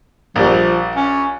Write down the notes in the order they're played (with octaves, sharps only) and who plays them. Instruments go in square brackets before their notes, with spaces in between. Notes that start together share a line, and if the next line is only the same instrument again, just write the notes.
[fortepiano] A#1 G3 [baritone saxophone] F3
[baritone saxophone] C#4